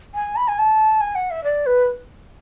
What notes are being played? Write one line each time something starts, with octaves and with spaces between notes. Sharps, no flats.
G#5
B5
G#5
A5
G#5
F#5
E5
D5
B4